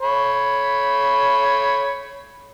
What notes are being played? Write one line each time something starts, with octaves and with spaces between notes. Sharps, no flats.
C#5 B5